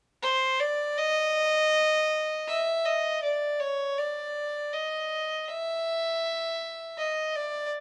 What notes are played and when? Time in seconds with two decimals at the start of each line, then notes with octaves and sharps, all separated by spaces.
0.22 C5
0.59 D5
0.98 D#5
2.48 E5
2.85 D#5
3.23 D5
3.60 C#5
3.98 D5
4.72 D#5
5.48 E5
6.98 D#5
7.36 D5